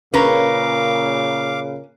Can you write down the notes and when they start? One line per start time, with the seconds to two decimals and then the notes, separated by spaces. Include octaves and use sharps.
0.14 A#2 C#3 C#4 A#4 B4 F5 D6